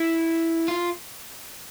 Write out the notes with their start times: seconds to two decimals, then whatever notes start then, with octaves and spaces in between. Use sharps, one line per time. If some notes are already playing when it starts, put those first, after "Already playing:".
Already playing: E4
0.68 F4